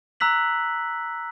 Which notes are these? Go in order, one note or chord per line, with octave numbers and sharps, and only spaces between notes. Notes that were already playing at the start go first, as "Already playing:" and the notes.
A#5 E6 F#6 B6 F#7